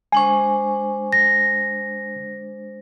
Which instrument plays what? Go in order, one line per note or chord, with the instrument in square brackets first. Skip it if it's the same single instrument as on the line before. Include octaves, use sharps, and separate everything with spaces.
[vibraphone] G#3 D4 C5 [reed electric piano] G#5 C#6
[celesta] A#6